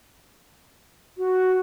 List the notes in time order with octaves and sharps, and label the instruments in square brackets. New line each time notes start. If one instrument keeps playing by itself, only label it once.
[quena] F#4